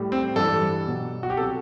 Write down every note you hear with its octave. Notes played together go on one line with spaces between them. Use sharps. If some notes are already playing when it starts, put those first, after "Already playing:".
Already playing: A2 G3
C4
G2 E3 G3 A4
B2 F#3
F#4
G4
C3 F#3 A4